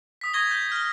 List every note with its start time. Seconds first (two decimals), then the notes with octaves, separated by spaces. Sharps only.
0.21 D#6 B6
0.34 C#6 D#6 G#6 A#6 G7
0.51 G6 G7
0.72 F6 G7